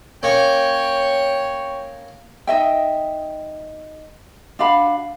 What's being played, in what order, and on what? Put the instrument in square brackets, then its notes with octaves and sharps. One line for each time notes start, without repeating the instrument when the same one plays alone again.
[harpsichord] A#3 C#4 [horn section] C#5 G5
[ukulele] D#4 D#5 E5 G5
D4 F#4 F5 B5